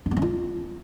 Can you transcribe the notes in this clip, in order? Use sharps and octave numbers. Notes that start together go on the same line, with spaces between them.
D4
B3
C#4
F4